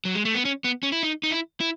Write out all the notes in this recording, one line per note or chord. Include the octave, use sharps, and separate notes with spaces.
F#3
G#3
A3
B3
C#4
B3
C#4
E4
D#4
D#4
E4
E4